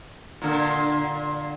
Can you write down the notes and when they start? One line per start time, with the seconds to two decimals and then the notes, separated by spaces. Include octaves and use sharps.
0.42 A#2 D3